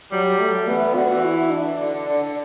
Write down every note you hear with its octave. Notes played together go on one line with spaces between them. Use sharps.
F#3 G3
A3
E3 B3
D3
D3 F#4
E3
E4
D4
D3
D3
D3
D3